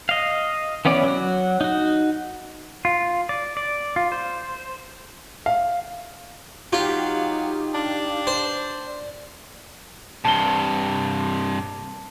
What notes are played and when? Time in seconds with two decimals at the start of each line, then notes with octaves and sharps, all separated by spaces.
0.09 D#5 F5
0.85 E3 B3 C#4 D5
1.04 F#3 F#4
1.61 D#4 F#4
2.85 F4
3.29 D5
3.57 D5
3.96 F4
4.12 C5
5.46 F5
6.73 F#3 D#4 F4 G4 F5
7.75 D4
8.27 C5
8.86 D5
10.25 G2 C3 A5 G7